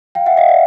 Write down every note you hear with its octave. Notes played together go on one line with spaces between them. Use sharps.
F5 G5
E5 F#5
D#5 F5
D5 E5